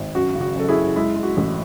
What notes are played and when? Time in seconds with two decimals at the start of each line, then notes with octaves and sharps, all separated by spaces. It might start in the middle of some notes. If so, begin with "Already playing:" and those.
Already playing: G#1
0.14 F#2 F#4
0.35 C#3
0.41 F#4
0.55 F#1 A4
0.69 E4 G#4
0.76 F#1
0.96 G#3 E4
1.16 G#3
1.23 F#4
1.37 A1